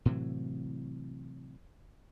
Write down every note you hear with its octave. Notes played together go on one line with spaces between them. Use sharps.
A2 C3 E3 F#3